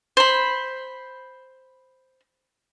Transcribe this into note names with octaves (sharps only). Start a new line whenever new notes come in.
C5 B5